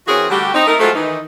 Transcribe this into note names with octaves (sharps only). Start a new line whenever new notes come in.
E3 C4 F#4 G#4 A#4 C#5
D3 G3 A3 F#4 G4
C4 D#4
A3 D#4 A#4
F#3 G#3 A3 F4 A4 C5
D#3 E3 D#4